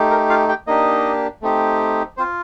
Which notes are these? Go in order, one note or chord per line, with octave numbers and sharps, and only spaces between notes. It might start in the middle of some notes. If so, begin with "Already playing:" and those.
Already playing: A3 D#4 G4
A#4
F4 F5
G4 G5
A#3 D4 D#4 G4 D#5
A3 C4 D#4 G4
C4 F4 C5